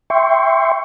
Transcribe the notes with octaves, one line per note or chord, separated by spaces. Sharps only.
E5 G5 C6 C#6